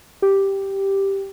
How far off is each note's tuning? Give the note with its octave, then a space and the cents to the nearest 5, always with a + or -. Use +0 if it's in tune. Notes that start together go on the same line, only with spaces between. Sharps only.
G4 +0